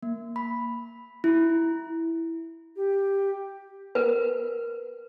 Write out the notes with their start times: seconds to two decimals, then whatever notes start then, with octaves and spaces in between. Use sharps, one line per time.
0.03 A#3
0.36 B5
1.24 E4
2.76 G4
3.95 A#4 B4